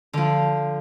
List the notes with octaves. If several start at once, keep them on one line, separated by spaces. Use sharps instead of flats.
D3 F3